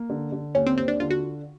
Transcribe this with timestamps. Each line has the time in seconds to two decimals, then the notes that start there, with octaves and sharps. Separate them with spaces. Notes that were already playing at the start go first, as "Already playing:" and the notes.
Already playing: A#3
0.10 D3
0.32 D3
0.55 D#2 C#4
0.67 C4
0.77 D#2 C4
0.88 D4
1.00 D3 F4
1.10 F#4